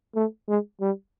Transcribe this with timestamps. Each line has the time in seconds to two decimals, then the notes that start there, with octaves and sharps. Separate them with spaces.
0.15 A3
0.48 G#3
0.81 G3